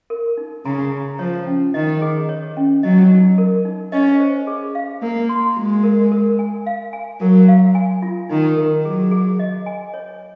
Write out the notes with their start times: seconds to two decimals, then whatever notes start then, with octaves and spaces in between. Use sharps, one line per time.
0.10 A#4
0.37 D#4
0.65 C#3 A#5
0.92 A#5
1.19 F3 C#5
1.47 C#4
1.74 D#3 D#5
2.02 G#4
2.29 C#5
2.57 C#4
2.83 F#3 D#5
3.10 D#4
3.38 A#4
3.65 D#4
3.92 C#4 D#5
4.20 C5
4.47 G#4
4.75 F5
5.02 A#3 A#4
5.29 C6
5.56 G#3 F#4
5.83 A#4
6.12 A#4
6.39 G#5
6.66 F5
6.93 G#5
7.21 F#3 A#4
7.48 F5
7.75 G#5
8.02 F4
8.29 D#3 D#4
8.57 A#4
8.84 F#3 G#4
9.11 G#4
9.39 D#5
9.66 G#5
9.94 C#5